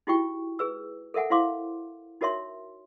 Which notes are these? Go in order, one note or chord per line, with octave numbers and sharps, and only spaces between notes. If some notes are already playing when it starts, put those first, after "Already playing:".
D#4 E4 F#4 G4 G5 C#6
G#4 B4 E6
A4 A#4 E5 F#5 G#5
E4 C5 F5 C6 D6
D#4 F#4 A#4 C#5 E5 C6